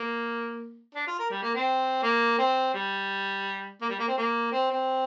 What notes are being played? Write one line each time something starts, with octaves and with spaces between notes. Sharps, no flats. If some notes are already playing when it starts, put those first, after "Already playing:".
Already playing: A#3
D4
F4
A#4
G3
A#3
C4
A#3
C4
G3
A#3
G3
A#3
C4
A#3
C4
C4